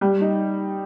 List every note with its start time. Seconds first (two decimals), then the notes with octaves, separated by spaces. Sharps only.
0.01 G3
0.21 D#4